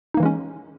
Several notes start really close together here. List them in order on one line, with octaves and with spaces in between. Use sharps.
D#4 A#3 E3 G#3 C#4